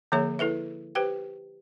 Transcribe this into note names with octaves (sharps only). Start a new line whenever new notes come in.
D3 F3 A#3 G#4 C#5 E5
E4 A4 B4 E5
G4 B4 C5 G5